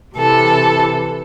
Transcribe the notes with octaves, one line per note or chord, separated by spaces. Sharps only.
C3 E3 A4